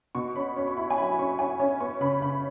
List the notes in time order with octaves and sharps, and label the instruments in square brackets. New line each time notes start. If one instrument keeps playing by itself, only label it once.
[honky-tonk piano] B2 C#6
C#4 B5
C#4 C#6
C#6
E4 B5
G#5
F#3 B5
C#4 C#6
C#4 G#5
C#4
B3 C#6
C#3 B5
C#3 B5